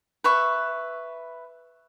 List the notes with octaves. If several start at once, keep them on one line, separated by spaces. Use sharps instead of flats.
B4 E5 C#6